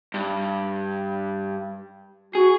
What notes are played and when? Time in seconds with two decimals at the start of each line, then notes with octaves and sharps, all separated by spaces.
0.14 G2
2.35 F#4 G#4